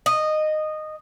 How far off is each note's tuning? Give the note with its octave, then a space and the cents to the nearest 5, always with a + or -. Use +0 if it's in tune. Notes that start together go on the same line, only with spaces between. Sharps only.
D#5 -15